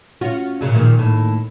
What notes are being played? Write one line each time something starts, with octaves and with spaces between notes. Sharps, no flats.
C#4 F4 F#4
A#2 C#3 F#3
A#2 D#3 F3
D#2 A2